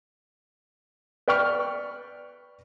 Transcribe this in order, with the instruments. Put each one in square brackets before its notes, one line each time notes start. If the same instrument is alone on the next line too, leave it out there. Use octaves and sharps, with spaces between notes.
[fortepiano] B4 D5 G5 B5 C#6 F6